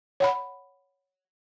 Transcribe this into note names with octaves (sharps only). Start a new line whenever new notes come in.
C#5 F#5 B5